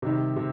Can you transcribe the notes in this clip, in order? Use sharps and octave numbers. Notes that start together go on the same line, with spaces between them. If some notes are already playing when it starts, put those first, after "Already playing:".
C3 D#3 G3
C3